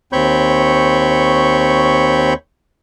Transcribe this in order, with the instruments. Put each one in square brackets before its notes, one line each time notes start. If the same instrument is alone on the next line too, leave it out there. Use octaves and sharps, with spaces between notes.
[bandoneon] D#2 C4 C#5 B5 C#6 G6